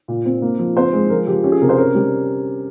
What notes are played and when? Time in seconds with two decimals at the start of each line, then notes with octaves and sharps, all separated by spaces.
0.08 A#2
0.25 C4
0.42 A#3
0.59 F3
0.77 C4 C5
0.93 G#3
1.10 F3 A#4
1.27 F3 G4
1.44 C#4 G4
1.52 G#4
1.61 C3 A#4
1.69 C5
1.78 C#4 A#4
1.95 G3